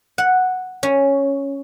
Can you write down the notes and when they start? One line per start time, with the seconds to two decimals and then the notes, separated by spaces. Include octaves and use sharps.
0.18 F#5
0.83 C#4